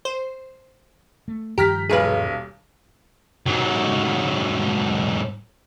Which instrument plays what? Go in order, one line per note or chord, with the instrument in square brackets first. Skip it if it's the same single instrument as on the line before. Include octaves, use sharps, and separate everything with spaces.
[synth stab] C5
[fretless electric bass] A3
[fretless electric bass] G2 D#3 F3 [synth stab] G4 [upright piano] A#5 F6 B6
[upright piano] D#1 B1 F6 [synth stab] G#4 B4
[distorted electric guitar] G#2 F#3